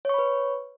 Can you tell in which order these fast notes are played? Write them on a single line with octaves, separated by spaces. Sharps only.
C#5 C#6 B5 B4